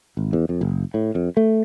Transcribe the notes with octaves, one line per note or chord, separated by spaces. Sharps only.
G#1
E2
F2
F#1
A2
F2
A3